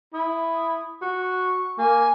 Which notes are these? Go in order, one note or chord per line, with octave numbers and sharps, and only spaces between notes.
E4 D#6
F#4
C#6
A#3 G#5